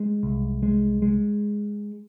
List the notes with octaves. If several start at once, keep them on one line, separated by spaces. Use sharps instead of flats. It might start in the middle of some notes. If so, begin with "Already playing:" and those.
Already playing: G#3
C2
G#3
G#3